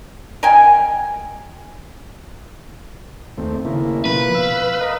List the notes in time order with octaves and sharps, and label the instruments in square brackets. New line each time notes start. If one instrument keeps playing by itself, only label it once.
[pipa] A#4 D#5 G5 G#5
[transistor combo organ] D#2 A3 C4
C#3 A#3 E4
[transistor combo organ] B2 F3 A#3 [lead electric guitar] B4
[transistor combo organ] F5 E6
A#4 D#5 F5